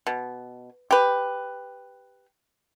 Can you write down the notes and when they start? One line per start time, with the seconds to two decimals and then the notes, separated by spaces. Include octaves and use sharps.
0.07 B2
0.91 G4 B4